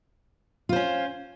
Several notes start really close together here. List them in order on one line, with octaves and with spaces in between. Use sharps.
F4 C5 C#4